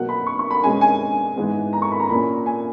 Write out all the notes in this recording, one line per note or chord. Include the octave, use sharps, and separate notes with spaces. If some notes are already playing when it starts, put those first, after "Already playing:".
Already playing: B2 F#3 A#3 F#5
B5
C#6
C#6
B5
B2 G#3 C#4 G#5
G#5
G#2 E3 G#3 B3
A#5
C#6
B5
A#5
A#2 A#3 C#4 B5
G#5